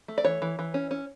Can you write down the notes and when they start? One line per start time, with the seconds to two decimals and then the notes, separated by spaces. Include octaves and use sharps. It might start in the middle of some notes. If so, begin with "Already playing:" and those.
0.08 A3
0.18 D5
0.25 E3 C#5
0.42 E3
0.59 E3
0.74 C#4
0.91 C#4